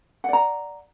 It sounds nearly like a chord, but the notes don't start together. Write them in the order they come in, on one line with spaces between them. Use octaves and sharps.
F#5 D5 A#5